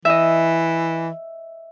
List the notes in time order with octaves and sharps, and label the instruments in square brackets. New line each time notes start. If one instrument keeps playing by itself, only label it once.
[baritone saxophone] E3 [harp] D#5 E5